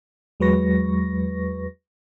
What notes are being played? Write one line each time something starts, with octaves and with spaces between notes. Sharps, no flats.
E2 F#3 G#3 B4 C#6 A#6